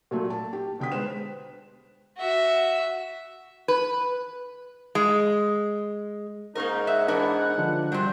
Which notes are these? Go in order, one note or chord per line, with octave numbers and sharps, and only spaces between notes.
A#2 F#3 A3
A5
G4
B2 D3 G5 D#6 B6
G#3 B4 C5 E7
F#4 E5
B4
G#3
G#2 A#3 C#4 D#4 A#4
E5 F#5
E3 B3 D4 A#4
D3 F3 D4
G1 C3 F#3 G3 G5